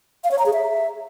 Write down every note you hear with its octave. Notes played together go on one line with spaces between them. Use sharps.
F5
C#5
A#5
G#4
E5